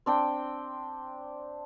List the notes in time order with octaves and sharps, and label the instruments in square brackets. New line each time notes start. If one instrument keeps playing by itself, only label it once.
[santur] C4 D4 G5